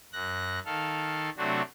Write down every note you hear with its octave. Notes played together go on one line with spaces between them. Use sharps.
F#2 F#6 A#6
D#3 A4 F5
C3 F#3 A3 C4 D4 F#4